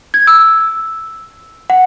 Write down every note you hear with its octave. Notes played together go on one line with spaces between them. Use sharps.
G#6
E6
F#5